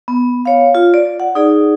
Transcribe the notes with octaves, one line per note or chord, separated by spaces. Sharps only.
B3
C#5 F5
F4
D5
F#5
D#4 G#4 D5